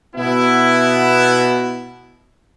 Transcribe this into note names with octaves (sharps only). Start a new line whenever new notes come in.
B2 B3 E4